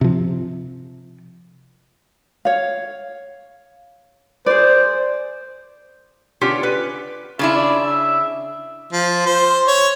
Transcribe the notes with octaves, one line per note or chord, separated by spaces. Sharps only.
C3 F3
C#5 F5
G#4 C5 D5
D3 B3 C#4 F4 G4
B4
C#3 D4 E4 F4
D5
E5
F3
C5
C#5